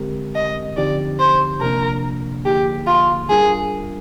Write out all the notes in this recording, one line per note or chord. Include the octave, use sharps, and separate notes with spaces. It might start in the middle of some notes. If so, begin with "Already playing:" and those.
Already playing: D3 G#3 C4 G4 A#4
D#5
D3 F3 C4 D#4 G4 D5
C5
C3 F3 A#3 D4 A#4
D3 F3 A#3 D#4 G4 G#4
F4
G3 D4 F4 G#4 A#4